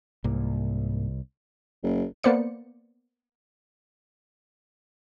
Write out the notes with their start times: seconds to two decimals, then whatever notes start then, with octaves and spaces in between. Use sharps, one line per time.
0.24 C2 G#2 A#3
1.83 F#1
2.24 A#3 B3 C5 D5 C#7